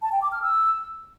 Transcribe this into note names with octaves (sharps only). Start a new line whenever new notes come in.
A5
G5
D6
F6
E6